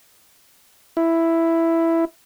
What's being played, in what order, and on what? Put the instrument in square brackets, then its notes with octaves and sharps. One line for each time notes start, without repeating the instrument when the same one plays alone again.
[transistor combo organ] E4